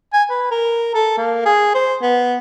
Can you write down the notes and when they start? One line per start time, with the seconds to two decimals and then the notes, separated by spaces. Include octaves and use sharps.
0.13 G#5
0.30 B4
0.51 A#4
0.95 A4
1.17 A#3
1.45 G#4
1.75 C5
2.02 B3